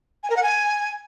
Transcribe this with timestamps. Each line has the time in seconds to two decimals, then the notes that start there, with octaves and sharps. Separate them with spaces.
0.23 G#5
0.30 A#4
0.36 F#5
0.43 G#5